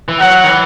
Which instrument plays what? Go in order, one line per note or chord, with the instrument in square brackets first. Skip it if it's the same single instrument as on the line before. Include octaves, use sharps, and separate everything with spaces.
[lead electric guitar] E3
[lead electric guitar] F#3 [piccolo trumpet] F#5
[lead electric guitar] D#3
E3